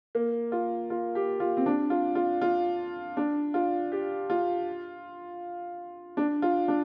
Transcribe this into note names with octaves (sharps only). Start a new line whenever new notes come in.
A#3
F4
F4
G4
F4
C4
D4
F4
F4
F4
D4
F4
G4
F4
D4
F4
D4